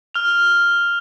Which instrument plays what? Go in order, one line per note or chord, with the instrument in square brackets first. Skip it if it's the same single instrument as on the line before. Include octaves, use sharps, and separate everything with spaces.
[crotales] F6 F7